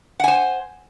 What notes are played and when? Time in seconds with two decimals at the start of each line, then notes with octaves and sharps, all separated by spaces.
0.20 F#5
0.24 G#5
0.28 C5